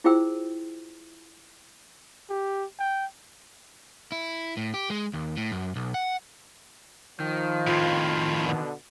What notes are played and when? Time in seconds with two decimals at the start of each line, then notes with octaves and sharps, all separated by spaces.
0.04 E4 F4 G#4 C5 G5 E6
2.30 G4
2.79 G5
4.12 E4
4.57 A2
4.74 G4
4.90 G#3
5.14 D#2
5.37 A2
5.52 F#2
5.76 B1
5.94 F#5
7.20 D#3 F3
7.67 F2 A2 F4
8.44 B2 D3